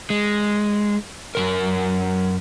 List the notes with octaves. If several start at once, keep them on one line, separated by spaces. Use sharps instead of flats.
G#3
F#2 C#3 A#4